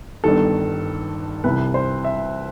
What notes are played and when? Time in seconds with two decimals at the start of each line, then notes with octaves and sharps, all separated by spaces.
0.24 G1 G2 D#3 A4
1.44 C2 C3 E3 B4
1.74 C5
2.05 E5